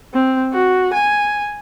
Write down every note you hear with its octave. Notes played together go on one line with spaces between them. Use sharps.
C4
F#4
G#5